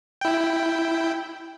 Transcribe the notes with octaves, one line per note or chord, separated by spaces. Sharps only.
E4 G5